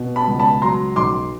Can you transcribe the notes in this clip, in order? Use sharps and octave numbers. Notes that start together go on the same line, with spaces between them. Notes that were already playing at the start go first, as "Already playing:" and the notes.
Already playing: B2
A5 B5
C#2
A5 B5
F#3 A#5 C6
B1 C6 D6